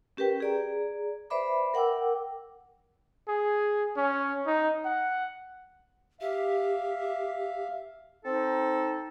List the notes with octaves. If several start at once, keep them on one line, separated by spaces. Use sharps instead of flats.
C#4 G4 A#4 B4 G5
G#4 D5 A#5
B4 C5 D5 E5 B5 D6
A#4 F#5 G5 D6 E6
G#4
C#4
D#4
F#5
G4 E5 F5
C4 D#4 A4